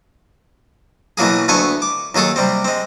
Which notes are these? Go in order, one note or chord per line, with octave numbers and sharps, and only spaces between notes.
B2 E3 F#3 A#3 G#4
D2 A3 B3 G#5 C6 C#6
D6
D#2 F#3 G#4 A4 A5
C3 G3 C4
G#3 C4